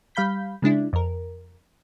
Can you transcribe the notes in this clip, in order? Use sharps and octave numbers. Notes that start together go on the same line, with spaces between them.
G3 F5 B5 G6 B6
C#3 G#3 D4 E4
F2 A#4